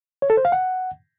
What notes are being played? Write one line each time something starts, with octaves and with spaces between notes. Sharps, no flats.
C#5
A4
C5
F5
F#5